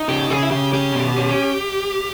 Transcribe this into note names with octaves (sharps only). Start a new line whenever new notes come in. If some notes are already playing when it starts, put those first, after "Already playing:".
Already playing: D#4
C#3 G4
C#3 G#4
E4
C#3 G4
C#4 G4
B2
C#4